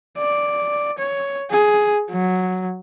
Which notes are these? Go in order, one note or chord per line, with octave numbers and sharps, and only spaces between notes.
D5
C#5
G#4
F#3